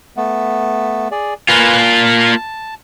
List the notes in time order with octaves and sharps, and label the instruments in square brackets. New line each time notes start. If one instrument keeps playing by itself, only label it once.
[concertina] A3 B3
G#4 D5
[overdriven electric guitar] A#3 F4 [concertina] B4 G#5
[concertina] A5